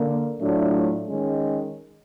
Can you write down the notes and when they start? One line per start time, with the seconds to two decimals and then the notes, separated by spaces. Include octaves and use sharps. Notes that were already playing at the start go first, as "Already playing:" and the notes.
Already playing: D3 A#3
0.39 A2 F#3 A3 D4 F4
1.06 D#3 G#3 C#4